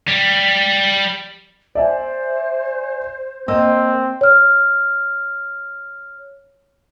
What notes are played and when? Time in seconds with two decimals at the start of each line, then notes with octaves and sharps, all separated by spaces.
0.08 G3
1.75 C5 D5 E5 G#5
3.48 A#3 C4 D#5 E6
4.21 C#5 F6